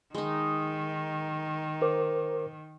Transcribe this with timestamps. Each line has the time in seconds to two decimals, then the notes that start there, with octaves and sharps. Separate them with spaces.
0.15 D#3 G#3 D#4
1.82 A#4 C5 D6